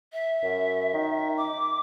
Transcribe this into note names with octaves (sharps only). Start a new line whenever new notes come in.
E5
F#2
D#3
D6